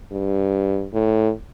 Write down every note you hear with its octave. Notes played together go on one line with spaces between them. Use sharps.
G2
A2